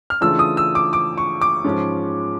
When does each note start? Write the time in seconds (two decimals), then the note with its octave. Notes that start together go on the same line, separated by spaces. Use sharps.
0.10 F6
0.21 C#3 E3 A3 D4 F4 E6
0.39 D#6
0.57 E6
0.75 D6
0.93 D6
1.18 C#6
1.41 D6
1.65 G#2 F3 G#3 C#4 F4